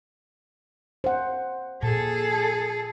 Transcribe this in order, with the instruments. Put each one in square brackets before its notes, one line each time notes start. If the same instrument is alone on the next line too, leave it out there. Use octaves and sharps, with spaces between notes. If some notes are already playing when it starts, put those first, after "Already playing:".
[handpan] C5 F#5
[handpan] A#2 [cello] G#4 A4